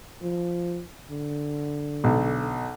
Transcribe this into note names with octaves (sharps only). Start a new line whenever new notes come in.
F3
D3
B1